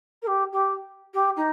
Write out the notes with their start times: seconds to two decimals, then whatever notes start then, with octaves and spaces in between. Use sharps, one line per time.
0.22 A#4
0.27 G4
0.52 G4
1.14 G4
1.36 D#4